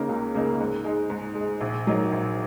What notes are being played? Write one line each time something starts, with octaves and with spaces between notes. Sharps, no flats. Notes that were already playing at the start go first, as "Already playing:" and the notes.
Already playing: C#3 A#3 D#4 A#4
C#2
C#3 A#3 D#4 A#4
G#2
G#3 D#4
G#2
G#3
D#4
A#1
G#2 F#3 D#4 A#4
A#1